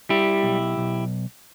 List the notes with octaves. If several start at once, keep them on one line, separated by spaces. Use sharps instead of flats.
G3 E4 G4
B1
B1